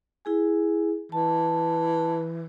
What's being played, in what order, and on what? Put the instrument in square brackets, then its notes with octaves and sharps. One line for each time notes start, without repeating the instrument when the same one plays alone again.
[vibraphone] E4 G#4 G#5
[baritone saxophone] E3 [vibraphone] A5